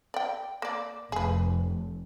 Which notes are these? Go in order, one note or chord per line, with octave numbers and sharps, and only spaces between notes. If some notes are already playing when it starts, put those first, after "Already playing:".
D5 G5
A#3 D5
F1 G#4 B4